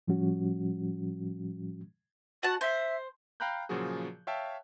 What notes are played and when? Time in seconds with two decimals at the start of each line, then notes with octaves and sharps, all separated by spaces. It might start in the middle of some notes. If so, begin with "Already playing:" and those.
0.08 A2 F3 G3 C#4 F#4
2.43 F#4 F#5 A5
2.61 C5 E5
3.40 F5 G5 A#5 B5 F#6 G6
3.69 A#2 C#3 F3 F#3 F#4 G#4
4.27 C#5 E5 F5 G5 A5